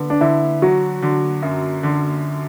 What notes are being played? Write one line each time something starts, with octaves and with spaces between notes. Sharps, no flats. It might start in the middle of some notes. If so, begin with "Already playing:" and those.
Already playing: D3 B3
D4
D3 E4
F#3 F#4
D3
F#2
D3